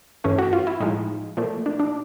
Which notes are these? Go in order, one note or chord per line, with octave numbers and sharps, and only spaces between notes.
G2 E3 A3 C#4
F#4
F4
E4
A2 F3 G#3 D#4
A#2 F3 A3
D4
D4